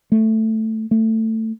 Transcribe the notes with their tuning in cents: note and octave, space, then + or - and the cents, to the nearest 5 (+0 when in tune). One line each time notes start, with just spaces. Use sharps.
A3 +5
A3 +15